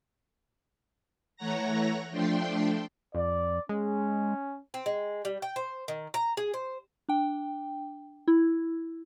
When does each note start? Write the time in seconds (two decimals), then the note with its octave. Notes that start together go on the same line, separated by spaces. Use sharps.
1.37 E3 A3 C#5 F#5 A#5 A#6
2.11 F3 A3 D4 G5 C6
3.15 F2 D5
3.69 G#3 C#4
4.74 C4
4.86 G#3
5.25 G3
5.42 G5
5.56 C5
5.88 D#3
6.14 A#5
6.37 G#4
6.54 C5
7.09 D4 G5
8.28 E4